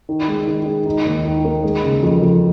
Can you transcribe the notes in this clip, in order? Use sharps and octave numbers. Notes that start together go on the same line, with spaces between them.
D#3
G#3
D#3
G#3
D#4
D#2
D#3
A#3
G#3
C#3
F2
F2